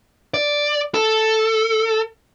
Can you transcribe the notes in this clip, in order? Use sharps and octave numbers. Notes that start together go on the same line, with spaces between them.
D5
A4